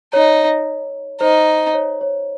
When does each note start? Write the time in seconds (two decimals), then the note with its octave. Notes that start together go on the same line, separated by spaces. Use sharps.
0.13 D#4 C#5
1.21 D#4 C5
1.74 C#5
2.01 C#5